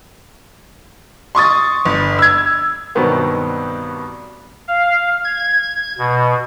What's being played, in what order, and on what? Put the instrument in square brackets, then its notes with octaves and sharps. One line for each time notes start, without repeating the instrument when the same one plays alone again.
[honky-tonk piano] C6 C#6 D#6 A6
G1
E6 G#6
[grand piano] G2 B2 D#3 F#3 B3 C4
[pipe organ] F5
G#6
B2